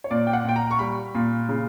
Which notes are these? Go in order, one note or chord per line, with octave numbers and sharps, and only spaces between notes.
C#5
A#2 D5
G5
F#5
A#2 G5
A#5
C#6
G3 B5
A#2
C#3